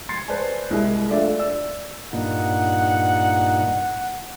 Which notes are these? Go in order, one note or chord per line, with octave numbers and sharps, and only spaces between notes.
C6 G#6 A6 C7 C#7
B4 C5 D5 G#5 A5
C2 G#3 E4 A#4 G#5 F#6
A3 D4 F4 D5 E5
D5 E6
G2 A#2 D#4 F#5